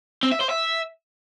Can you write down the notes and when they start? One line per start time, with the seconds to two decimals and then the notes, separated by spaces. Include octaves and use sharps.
0.23 C4
0.32 E5
0.41 C5
0.49 E5